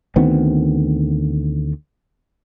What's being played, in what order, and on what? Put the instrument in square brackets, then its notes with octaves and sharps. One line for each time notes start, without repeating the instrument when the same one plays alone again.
[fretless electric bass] D2 D#3 B3 C4